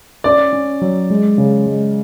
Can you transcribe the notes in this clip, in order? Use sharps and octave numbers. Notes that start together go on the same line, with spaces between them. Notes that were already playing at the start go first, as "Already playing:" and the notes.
C#4 D5
C#4
F#3
G#3
C#3
G#3